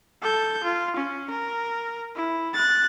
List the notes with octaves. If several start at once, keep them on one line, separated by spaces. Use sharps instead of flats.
A4 G6
F4
C#4
A#4
E4
F#6 A6